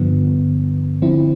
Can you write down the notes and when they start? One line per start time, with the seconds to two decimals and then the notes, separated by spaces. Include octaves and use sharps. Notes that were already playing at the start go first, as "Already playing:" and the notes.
Already playing: G2 D3 F3 B3
1.02 D3 F3 C4 E4